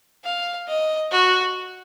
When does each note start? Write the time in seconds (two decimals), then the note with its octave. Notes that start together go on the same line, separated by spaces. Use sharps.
0.24 F5
0.67 D#5
1.11 F#4